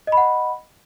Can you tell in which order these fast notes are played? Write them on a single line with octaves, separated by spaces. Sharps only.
D#5 B5 F#5